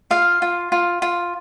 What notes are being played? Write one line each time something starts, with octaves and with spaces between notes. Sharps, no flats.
F4 F5
F4
F4
F4